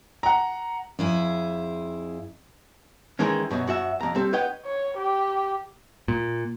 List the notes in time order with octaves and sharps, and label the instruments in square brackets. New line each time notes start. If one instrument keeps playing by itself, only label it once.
[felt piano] F#5 A#5
[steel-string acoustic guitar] F2 E4 G#4
[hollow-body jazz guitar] D#3 E3 G#3 C#4
F#2 B2 F#3
F#2 F#4 E5
F2 A#5
G3 C4 A4
B4 C#5 D#5 F#5 G5
[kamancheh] C#5
G4
[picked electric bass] A#2